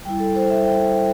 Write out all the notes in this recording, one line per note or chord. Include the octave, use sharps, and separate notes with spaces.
G3 E4 G5
A4
C5
E5
G5
G5